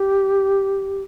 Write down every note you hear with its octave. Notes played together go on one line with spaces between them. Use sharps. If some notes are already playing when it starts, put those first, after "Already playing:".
Already playing: G4